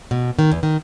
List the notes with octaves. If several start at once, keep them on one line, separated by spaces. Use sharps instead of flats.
B2
D#3
E2
D#3